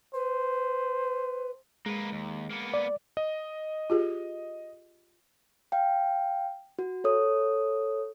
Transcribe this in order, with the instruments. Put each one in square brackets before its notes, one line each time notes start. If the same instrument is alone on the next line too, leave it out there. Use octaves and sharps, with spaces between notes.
[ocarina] B4 [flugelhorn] C5
[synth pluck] G#3 [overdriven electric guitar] A#3 B4
[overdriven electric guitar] D#2
A#3 B3
[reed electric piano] D5
[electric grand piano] D#5
[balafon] F4 G4 G#4
[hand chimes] F5 G5
F#4
A4 C#5 D#6